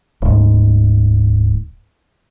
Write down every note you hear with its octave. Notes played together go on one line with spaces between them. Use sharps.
D1 G#2